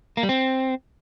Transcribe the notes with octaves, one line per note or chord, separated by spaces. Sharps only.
A#3
G3
C4